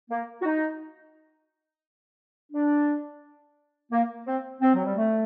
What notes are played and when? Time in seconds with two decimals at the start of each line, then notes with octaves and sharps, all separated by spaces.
0.10 A#3
0.41 F#4
0.45 D#4
2.52 D4
3.91 A#3
4.26 C4
4.61 C4
4.74 F#3
4.84 G3
4.96 A3